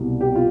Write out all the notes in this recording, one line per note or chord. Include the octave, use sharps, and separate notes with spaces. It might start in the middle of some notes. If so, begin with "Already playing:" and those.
Already playing: C2 B2 G3
G4
F4